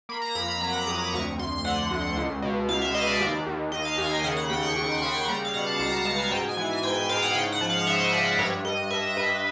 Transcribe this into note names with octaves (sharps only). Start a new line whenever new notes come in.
A#3 B5
A#5
F2 B5
B5
F#3 A#5
D6
F2 D#6
D6
D2 C#6
D2 C6
D3 F#5
D2
C#2
B2
C#2 F5
E5
B2 D#5
D5
D#2
D#2
D#2 D#5
F5
D#2 G#5
G5
C#3 F#5
F#5
D#2 G5
C#6
D#2 C#6
C6
C#3 B5
G3 A#5
F5
B2 F#5
A5
C#2 A#5
A#5
B2 A5
G#5
G#2 G5
G#5
E3
G#5
G#2 G5
G#2 F5
F#5
C#3 G5
F#5
F3
F5
C#3 E5
D#5
F3 D5
D5
G2 C#5
G2 D#5
G2 E5
G2 B4